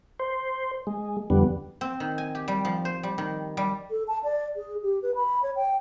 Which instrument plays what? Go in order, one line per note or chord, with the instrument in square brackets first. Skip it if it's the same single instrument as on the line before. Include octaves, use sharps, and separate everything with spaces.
[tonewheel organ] C5
G#3
F2 D3 G3 B3
[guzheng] C4
D#3
G#5
G4
G3
F3
C5
G3
D#3
G3
[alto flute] A4
A5
D5
G#4
G4
B4
B5
C#5
G5